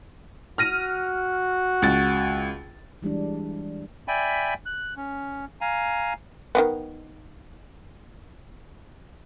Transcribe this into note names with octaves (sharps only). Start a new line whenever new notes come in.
F#4 F6 A#6 D#7
C#2 A6
E3 G3 G#3 D4
D5 E5 G5 G#5 B5
F#6
C#4
F5 G#5 A#5
D#3 F#3 B3